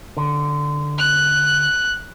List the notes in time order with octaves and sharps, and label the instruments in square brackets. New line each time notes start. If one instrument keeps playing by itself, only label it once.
[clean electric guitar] D3
[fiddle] F#6